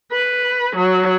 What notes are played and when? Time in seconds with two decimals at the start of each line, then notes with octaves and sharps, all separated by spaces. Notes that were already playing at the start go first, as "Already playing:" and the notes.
0.12 B4
0.76 F#3